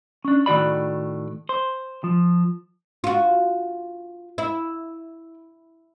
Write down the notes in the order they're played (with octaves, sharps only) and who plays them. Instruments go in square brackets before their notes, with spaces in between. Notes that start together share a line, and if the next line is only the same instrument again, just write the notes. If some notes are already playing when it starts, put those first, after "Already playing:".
[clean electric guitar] C#4 D4
A2 D#3 F#4 D5 B5
C5
F3
[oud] F4 F#4
E4